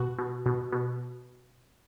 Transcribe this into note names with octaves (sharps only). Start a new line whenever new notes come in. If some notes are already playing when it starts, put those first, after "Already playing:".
Already playing: B2 F#4
B2
B2
B2